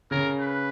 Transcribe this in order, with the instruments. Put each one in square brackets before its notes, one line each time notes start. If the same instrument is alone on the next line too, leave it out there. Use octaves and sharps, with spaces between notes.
[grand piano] C#3 [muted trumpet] A#4
[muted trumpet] B4